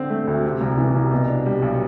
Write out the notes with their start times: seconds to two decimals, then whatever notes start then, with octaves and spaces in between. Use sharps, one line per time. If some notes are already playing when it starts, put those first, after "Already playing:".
Already playing: D3 C4
0.10 A3
0.27 D2
0.44 C3
0.61 C2
0.78 E3
0.95 C2
1.11 B2
1.29 D4
1.46 G3
1.62 B1